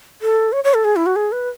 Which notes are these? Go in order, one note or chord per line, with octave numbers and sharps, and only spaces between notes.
A4
C#5
C#5
A4
G#4
E4
F#4
G#4
B4